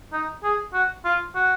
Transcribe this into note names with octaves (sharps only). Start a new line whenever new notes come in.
D#4
G#4
F#4
F4
F#4